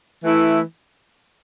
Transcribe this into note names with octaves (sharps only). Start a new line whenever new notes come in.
E3 A3 E4